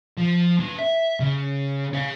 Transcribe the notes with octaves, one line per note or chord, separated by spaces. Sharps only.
F3
D4 B4
E5
C#3
C#5 F5